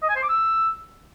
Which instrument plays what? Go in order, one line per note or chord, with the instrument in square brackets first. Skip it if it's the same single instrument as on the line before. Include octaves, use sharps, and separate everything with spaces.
[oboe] D#5
G#5
C5
D6
E6